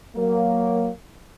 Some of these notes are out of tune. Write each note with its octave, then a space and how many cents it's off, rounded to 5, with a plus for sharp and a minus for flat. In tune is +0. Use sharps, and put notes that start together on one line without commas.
F#3 +0 A#3 +0